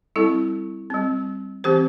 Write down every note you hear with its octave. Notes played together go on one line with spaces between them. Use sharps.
G3 C4 E4 A4
G3 C4
E3 C4 G4 C5